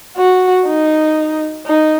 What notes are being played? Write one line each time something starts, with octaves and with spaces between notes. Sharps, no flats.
F#4
D#4
D#4